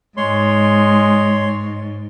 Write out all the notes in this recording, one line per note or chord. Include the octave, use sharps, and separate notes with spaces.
G#2 G#3 C#5 C6